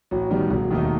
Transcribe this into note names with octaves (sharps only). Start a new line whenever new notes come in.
A1 F#4
G2 D#3 G3 B3
E1 F#4
D#2 D#3 A3 D#4